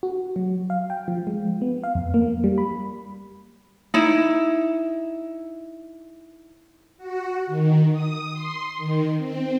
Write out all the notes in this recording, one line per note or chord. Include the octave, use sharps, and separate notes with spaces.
F#4
F#3
F5
G5
F3
G#3
B3
F5
F2
A#3
G3
B5
D#4 E4
F#4
D#3
D#6
C6
D#3
C4